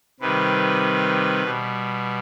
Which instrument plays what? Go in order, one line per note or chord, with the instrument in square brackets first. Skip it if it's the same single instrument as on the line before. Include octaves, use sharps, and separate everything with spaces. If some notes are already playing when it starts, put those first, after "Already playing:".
[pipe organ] C3 D#3 G3 B4
B2 G3